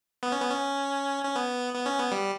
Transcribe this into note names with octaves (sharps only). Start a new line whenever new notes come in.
B3
C#4
B3
C#4
C#4
B3
B3
C#4
B3
G3